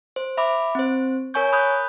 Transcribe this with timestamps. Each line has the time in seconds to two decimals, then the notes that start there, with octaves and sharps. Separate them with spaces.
0.16 C5
0.37 E5 B5 D6
0.75 C4 C5
1.34 A#4 C#5 G#5 C#6 G6
1.53 B5 D#6 F#6 G6